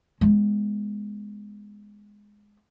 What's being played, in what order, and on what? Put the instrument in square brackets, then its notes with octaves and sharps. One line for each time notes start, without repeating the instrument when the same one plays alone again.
[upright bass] G#3 B3